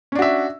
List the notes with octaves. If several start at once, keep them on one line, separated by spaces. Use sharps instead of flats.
C#4 D4 F#4 E5